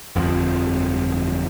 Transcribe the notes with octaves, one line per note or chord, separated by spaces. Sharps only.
G1 F2 A2 F3